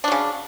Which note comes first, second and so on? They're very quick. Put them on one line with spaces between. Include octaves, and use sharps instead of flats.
D4 F#3 C#3